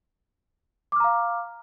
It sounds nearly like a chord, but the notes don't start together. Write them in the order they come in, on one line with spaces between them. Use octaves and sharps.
D6 F6 A#5 F5